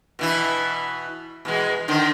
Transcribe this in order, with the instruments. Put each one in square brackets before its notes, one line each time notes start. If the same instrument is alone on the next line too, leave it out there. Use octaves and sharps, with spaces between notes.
[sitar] B2 E3 E4
B2 E3 G#3
D3 D#3 C4